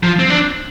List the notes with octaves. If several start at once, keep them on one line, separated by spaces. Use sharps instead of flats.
F3
C4
D4